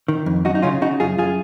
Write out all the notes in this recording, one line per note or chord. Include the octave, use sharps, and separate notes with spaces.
D#3
F2
F#2 D#4 F#4
D#4
C#3 C#4 F4
C#3 D#4 F#4
F#2 F4 G#4
F#2 F4 G#4